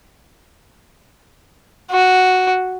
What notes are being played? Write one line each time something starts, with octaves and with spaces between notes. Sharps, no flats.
F#4